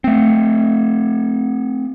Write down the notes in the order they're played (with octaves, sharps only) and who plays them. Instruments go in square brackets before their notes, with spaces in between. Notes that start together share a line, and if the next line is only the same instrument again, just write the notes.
[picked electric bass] A3 C4